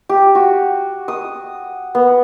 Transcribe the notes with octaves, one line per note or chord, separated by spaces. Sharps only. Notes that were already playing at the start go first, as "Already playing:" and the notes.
G4
F#4
D#6
B3